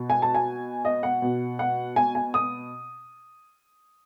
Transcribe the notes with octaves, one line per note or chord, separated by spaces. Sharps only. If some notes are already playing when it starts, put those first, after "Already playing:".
Already playing: B2
G#5
A5
G#5
D#5
F#5
B2
F#5
G#5
G#5
D#6